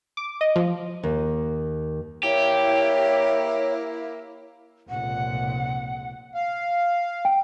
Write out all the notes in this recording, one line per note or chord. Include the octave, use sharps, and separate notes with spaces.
D6
D#5
F3
D#2
A#3 E4 G4 C#5
F1 C#2 A#2 F#5
F5
G5